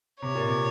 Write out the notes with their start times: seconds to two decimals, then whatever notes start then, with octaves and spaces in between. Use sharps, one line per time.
0.22 C3 C#5
0.35 A#2
0.48 C3